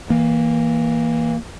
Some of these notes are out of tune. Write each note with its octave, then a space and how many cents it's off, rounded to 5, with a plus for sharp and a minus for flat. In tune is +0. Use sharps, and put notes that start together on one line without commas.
E3 -20 A#3 +0